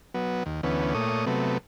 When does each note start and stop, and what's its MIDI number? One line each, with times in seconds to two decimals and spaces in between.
0.14 0.43 54
0.14 0.43 59
0.46 0.61 39
0.63 0.94 38
0.63 0.94 52
0.63 0.94 59
0.63 0.94 61
0.95 1.25 46
0.95 1.25 57
0.95 1.25 73
0.95 1.25 87
1.26 1.58 48
1.26 1.58 54
1.26 1.58 57
1.26 1.58 59